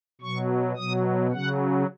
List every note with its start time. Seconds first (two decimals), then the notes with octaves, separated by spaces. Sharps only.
0.21 B2 F#3 C#6
0.76 B2 F#3 D#6
1.31 C#3 F#3 F#5